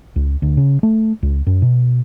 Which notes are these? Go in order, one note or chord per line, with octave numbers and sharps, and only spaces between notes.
C#2
D2
C#3
A3
C#2
F#2
B2